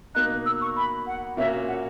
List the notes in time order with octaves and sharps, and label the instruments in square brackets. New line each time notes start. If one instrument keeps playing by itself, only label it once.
[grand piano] B2 A#3 D#4 [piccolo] F#6
[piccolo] E6
C#6
B5
F#5
[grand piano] A#2 A#3 C#4 F#4 [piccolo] E5
[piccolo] F#5